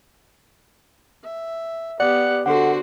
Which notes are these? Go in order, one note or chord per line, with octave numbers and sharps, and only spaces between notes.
E5
B3 G4 D5 F#5
D3 F#4 A4 C5 F#5